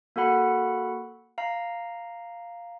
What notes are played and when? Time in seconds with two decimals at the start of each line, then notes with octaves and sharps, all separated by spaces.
0.16 A#3 F#4 A4 F#5 B5
1.38 F5 A#5